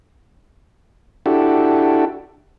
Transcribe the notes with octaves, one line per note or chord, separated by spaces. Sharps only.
D4 E4 F#4 G4 A4